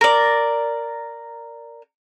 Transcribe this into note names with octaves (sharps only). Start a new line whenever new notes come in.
A#4 D5